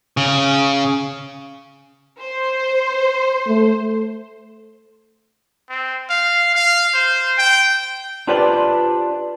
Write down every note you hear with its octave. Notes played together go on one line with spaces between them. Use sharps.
C#3
C5
A3
C4
F5
F5
C5
G5
D4 F4 G4 B4 C5 D5